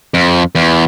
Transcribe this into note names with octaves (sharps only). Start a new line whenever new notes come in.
F2
E2